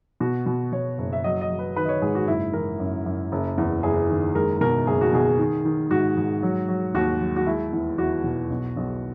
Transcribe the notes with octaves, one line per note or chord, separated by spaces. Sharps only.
B2 F#4
B2
B2 C#5
F#1
E5
F#3 D#5
D#5
F#3
B4
D#3 B4
D#5
C#5
G#2 G#4
F#4
F#1 E4
E3 A#4
F#2
F#2
F#1
E2
F#1 G#4
D#3
G#3 A#4
B2 A#4
F#1 G#4
F#4
B2 G#4
D#3
D#3
G#2 F#4
G#2
F#3
F#3
D#2 F#4
F#3
F#4
G#3 E4
E2
E2 F#4
B2
B1
B1